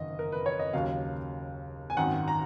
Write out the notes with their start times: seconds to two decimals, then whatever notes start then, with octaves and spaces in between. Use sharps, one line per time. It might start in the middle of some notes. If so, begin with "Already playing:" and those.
Already playing: F#1 F2 D#3 D#5
0.19 A#4
0.32 B4
0.46 C#5
0.60 D#5
0.73 D#2 C#3 F#3 F5
1.90 G#5
1.97 G#1 F#2 D#3 F#5
2.28 A#5